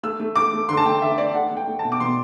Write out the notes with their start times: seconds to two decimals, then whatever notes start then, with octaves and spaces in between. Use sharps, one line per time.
0.03 A3 E6
0.20 A3
0.36 A3 D6
0.53 A3
0.69 D3 C6
0.77 A5
0.85 A3 G5
1.01 D3 E5
1.18 A3 D5
1.34 A3 F#5
1.51 A3
1.57 G5
1.67 A3
1.79 A5
1.85 B2
1.92 D6
2.00 B2 C6